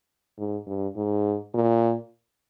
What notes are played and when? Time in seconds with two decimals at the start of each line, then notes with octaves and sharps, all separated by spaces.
0.38 G#2
0.67 G2
0.96 G#2
1.54 A#2